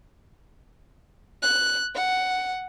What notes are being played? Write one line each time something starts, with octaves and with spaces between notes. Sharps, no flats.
F#6
F#5